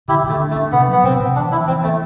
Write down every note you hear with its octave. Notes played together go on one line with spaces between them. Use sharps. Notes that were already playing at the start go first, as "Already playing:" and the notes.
D3 E4 G4
D3
A3
D4
A3
D4
C3 B3
F#3 B3
C3 C4
C3
E3 D4
E3 E4
E3 C4
A3 B3